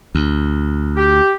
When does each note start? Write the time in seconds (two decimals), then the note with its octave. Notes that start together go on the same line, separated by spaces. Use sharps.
0.15 D2
0.96 G4